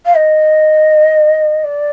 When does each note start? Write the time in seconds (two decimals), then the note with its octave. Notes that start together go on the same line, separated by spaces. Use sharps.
0.06 F5
0.15 D#5
1.64 D5